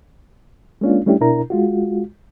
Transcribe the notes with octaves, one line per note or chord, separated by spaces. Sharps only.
G#3 A#3 C#4 D4 F4
G3 A3 C#4 D4 E4 G4
B2 D4 E4 A#4 A#5
G#3 F4 F#4